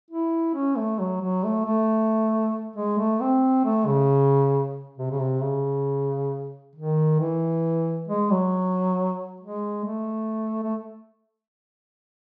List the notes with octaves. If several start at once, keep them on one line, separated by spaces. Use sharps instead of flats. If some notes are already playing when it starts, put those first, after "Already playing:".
E4
C#4
A3
F#3
F#3
A3
A3
G#3
A3
C4
A3
C#3
C3
C#3
C3
C#3
D#3
E3
G#3
F#3
G#3
A3
A3